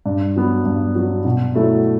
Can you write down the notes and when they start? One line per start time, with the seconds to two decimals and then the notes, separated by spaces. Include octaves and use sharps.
0.06 G2
0.36 F#3 B3
0.66 G2
0.95 F#3 B3
1.25 B2
1.55 F#3 A3 E4 A4